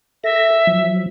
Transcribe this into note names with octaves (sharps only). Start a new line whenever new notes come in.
A4 E5 A#6
F3 F#3